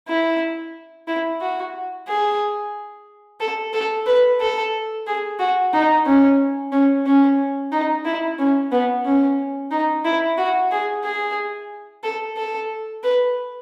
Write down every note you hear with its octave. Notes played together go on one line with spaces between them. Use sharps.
E4
E4
F#4
G#4
A4
A4
B4
A4
G#4
F#4
D#4
C#4
C#4
C#4
D#4
E4
C#4
B3
C#4
D#4
E4
F#4
G#4
G#4
A4
A4
B4